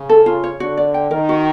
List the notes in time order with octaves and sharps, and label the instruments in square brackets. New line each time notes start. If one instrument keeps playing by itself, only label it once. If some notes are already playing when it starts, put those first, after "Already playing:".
Already playing: [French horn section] C#3
[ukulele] A4
F4
C#5
[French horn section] D3 [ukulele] F#4
[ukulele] D5
G5
[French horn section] D#3 [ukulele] A#4
[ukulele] F#4